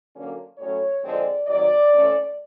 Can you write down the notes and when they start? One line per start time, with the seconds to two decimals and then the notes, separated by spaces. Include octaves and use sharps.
0.14 D3 F#3 A#3 C#4
0.58 A2 F#3 A3 C#4 C#5
1.02 D3 F3 G#3 C4 D5
1.46 C3 D#3 F#3 D5
1.91 E3 A3 C#4